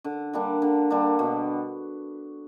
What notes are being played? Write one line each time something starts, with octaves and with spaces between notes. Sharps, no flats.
D3
G3 A#3 D4
D3
G3 A#3 D4
B2